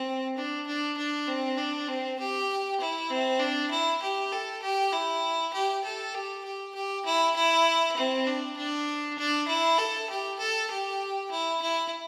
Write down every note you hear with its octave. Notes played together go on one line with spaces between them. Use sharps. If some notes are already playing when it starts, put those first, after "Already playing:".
Already playing: C4
D4
D4
D4
C4
D4
C4
G4
E4
C4
D4
E4
G4
A4
G4
E4
G4
A4
G4
G4
G4
E4
E4
C4
D4
D4
D4
E4
A4
G4
A4
G4
E4
E4